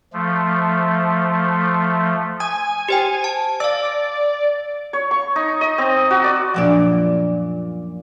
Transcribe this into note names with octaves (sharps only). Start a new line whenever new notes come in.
F3 A3
G#5 D#6
G4 C5 G5
A5
D5 F5 E6
C#5
C#6
D#4
D#5
C4
F#4
D5
F#2 A#2 F3 D4 D5